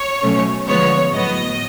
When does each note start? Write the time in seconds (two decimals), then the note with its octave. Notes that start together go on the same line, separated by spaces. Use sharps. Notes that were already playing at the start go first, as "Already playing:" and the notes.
Already playing: C#5
0.22 B2 F#3 A3 C#4
0.67 D3 F3 G#3 B3 C#5
1.13 A2 F#3 B3 D#5